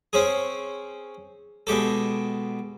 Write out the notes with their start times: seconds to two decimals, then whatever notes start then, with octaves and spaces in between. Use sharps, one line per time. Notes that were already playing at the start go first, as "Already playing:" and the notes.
0.13 C4 C#4 G#4
1.67 B2 G#3 G4 A4